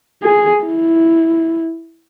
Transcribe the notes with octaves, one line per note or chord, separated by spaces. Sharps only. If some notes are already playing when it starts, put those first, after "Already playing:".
G#4
E4